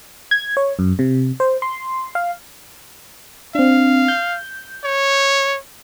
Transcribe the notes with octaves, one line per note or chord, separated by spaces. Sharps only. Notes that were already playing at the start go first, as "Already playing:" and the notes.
G#6
C#5
F#2
C3
C5
C6
F5
C4 D4 F5
G6
C#5